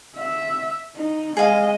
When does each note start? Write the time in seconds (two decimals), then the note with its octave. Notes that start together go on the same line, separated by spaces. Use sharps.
0.17 E5
0.96 D#4
1.37 G#3 G#4 D#5 F5